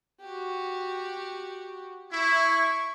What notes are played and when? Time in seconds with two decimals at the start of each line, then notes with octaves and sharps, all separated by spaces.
0.21 F#4 G4
2.12 E4 C#6